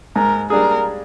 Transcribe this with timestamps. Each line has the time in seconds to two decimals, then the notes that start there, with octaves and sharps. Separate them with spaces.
0.16 G#2 A#4
0.50 G3 D4 G#4 A#4